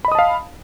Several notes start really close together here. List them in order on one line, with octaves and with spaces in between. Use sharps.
B5 D#5 D#6 A5 F5